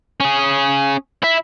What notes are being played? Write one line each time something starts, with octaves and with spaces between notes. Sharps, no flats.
C#4 G#4
E4 E5